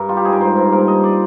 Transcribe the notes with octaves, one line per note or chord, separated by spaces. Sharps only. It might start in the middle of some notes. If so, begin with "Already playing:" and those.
Already playing: G2 A#4
G3 F4
G4
G#2 G#4
A#4
G2 C5
G2
A#2 A#4
A#2 D#5
D5